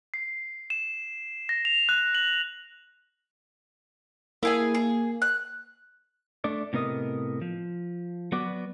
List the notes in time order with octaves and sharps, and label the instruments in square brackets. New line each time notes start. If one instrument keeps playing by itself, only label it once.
[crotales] C7
E7
A#6
F7
F#6
F#7
[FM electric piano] A#3 [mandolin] E4 G#4 G#5
[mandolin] G#4
F#6
[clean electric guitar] A3 D4 D5
A2 C3 B3 A#4 D#5
F3
F#3 B3 F#4 B4 D5